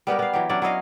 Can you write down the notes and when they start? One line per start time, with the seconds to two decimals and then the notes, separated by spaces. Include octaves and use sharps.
0.07 G3 B3 G4 A#4
0.19 B3 F5
0.33 E3 F#3 G4
0.49 F#3 C#4 D4 D5
0.62 F#3 E4 D#5 F5